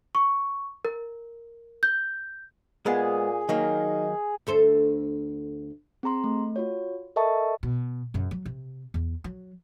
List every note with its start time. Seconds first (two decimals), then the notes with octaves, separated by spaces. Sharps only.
0.15 C#6
0.85 A#4
1.83 G6
2.86 A#2 G#3 B3 G#4
3.49 D#3 F#3 A#3 D#4
4.47 D2 A4 C5
6.03 C4 G#4 A#5 C6
6.24 A3
6.56 F4 F#4 C#5
7.16 A4 A#4 D#5 E5 A5 C#6
7.63 B2
8.14 F#2 C#3
8.31 F#3
8.45 C3
8.94 E2
9.24 F#3